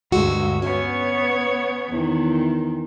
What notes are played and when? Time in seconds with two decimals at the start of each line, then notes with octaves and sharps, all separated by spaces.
0.12 D2 G2 G#3 F#4 E6
0.62 B3 C#4 C#5 G#6
1.89 E2 D#3